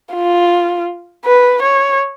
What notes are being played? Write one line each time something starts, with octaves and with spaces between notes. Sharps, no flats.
F4
B4
C#5